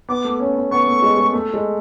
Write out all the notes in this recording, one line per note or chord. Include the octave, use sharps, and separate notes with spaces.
B3 D6
A3
C#4
B3
B3 C#6
A3
G#3
G#3
A3
G#3